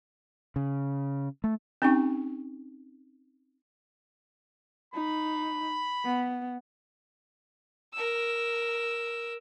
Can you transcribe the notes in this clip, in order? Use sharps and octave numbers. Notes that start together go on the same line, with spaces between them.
C#3
A3
C4 C#4 D#4 G4 G5 C#6
D#4 B5
B3
A#4 E6